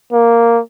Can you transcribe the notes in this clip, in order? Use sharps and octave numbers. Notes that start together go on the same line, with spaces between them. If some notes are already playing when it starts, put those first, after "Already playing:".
A#3